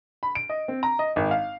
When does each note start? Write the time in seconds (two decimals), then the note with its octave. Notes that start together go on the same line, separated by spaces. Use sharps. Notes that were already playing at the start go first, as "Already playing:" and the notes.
0.23 B5
0.35 D7
0.50 D#5
0.68 C4
0.83 A#5
0.99 D#5
1.16 G#1
1.31 F5